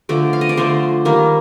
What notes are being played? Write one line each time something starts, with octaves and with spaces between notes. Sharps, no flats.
D3 F3 A3 D5
F5
D#5
D5
D3 F3 A3 C5
D#3 G3 A#3